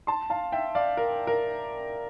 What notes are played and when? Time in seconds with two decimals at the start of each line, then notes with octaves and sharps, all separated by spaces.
0.07 A5 C6
0.30 F5 A5
0.52 E5 G5
0.75 D5 F5
0.97 A#4
1.27 A#4